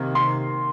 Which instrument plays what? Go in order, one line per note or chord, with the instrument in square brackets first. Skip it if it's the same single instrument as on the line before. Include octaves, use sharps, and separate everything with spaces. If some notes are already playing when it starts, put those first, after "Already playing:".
Already playing: [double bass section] C3 D#3 A#3
[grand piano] C6